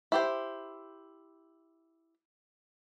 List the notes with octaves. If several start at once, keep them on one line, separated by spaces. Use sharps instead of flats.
E4 G4 C5